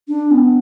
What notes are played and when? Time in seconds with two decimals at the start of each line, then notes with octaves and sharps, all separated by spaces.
0.08 D4
0.30 B3